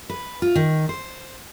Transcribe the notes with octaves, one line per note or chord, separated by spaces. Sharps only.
B4
F4
D#3
C5